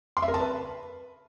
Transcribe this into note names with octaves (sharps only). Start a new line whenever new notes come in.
C6
E5
A#4
A5
B4